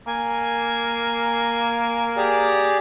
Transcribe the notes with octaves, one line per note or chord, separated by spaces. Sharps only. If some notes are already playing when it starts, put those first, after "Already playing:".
A#3 G#5
G4 G#4 D5